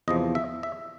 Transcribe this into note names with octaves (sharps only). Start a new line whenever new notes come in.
E2 C3 F3 D#5
E5
E5